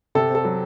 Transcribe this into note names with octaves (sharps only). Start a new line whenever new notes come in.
C3 A4
C4
A4
F#3